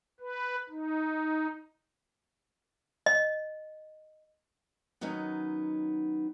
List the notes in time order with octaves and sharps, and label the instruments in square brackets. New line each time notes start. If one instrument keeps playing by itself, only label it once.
[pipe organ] B4
D#4
[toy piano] D#5
[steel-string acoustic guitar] D#3 F#3 B3 C#4 D#4